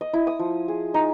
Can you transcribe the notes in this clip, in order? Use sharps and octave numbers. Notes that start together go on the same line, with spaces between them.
D#5
E4
D#6
F3
G#4
D#4